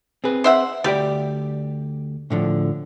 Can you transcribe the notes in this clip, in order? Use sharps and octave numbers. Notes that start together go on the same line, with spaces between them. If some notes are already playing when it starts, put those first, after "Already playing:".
C4 G#4 B4
C5 E5 F#5
D2 G3 G4 D5
A2 D3 F3